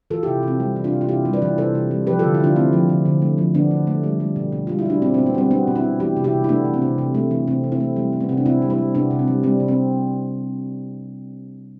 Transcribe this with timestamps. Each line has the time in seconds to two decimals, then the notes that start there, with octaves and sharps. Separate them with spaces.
0.10 E3 F4 A4
0.23 E4 G4
0.27 C3
0.43 C3 C4
0.60 G3
0.76 E3
0.84 D4 F4
0.92 C3
1.01 F4
1.09 C3 E4 G4
1.25 G3
1.33 B4 D5
1.42 E3
1.58 C3 A4 C5
1.75 C3
1.91 G3
2.07 F3 G4 B4
2.19 F4 A4
2.23 D3
2.34 E4
2.40 D3 D4 F4
2.56 A3 C4 E4
2.73 F3
2.89 D3
3.05 D3
3.22 A3
3.38 F3
3.54 D3 B3 D4
3.71 D3
3.87 A3
4.03 G3
4.20 G3
4.36 B2
4.52 B2
4.67 G3 F4
4.79 E4
4.85 G3 D4
5.02 B2 C4
5.14 C4
5.18 B2
5.26 B3
5.34 G3 C4
5.51 G3 B3 D4
5.67 B2
5.75 C4 E4
5.84 B2
6.00 E3 E4 G4
6.16 C3
6.24 E4 G4
6.33 C3
6.44 E4
6.49 A3 B3 D4
6.65 E3
6.74 C4
6.82 C3
6.98 C3
7.14 A3
7.31 E3
7.47 C3 C4
7.64 C3
7.72 C4 E4
7.80 A3
7.96 G3
8.13 G3
8.20 B3
8.29 C3 C4
8.37 D4
8.46 C3 C4 E4
8.62 G3
8.70 C4 E4
8.78 G3
8.95 C3 B3 D4
9.11 C3
9.19 C4
9.28 G3
9.43 G3 C4
9.60 C3
9.68 C4